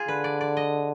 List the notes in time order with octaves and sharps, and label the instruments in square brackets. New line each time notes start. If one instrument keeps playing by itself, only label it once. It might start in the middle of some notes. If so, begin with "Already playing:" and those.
Already playing: [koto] F4 G#4
[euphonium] D3 [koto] B4
[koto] D5
D5
D#5